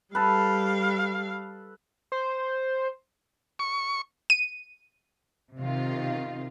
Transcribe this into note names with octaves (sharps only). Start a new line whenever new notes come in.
G3 A4 B4 F5
C5
C#6
D#7
C3 D#3 F4